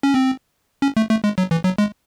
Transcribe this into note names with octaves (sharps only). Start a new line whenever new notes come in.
C#4
C4
C#4
A3
A3
G#3
F#3
E3
F#3
G#3